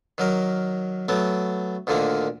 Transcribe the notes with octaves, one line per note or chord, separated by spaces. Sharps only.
D#3 F#3 A#4
F#3 A3 B3
D2 A#2 D3 D#3 A#3